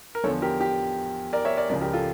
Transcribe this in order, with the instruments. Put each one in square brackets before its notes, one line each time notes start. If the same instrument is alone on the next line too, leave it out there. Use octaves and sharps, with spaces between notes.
[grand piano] A#4
E2 D3 F3 A4 C#5
G4 A#4
G4
A#4 D5
C#5 E5
A#4 D5
C#2 C#3 F3 A#4 D5
G4 A#4
F4 A4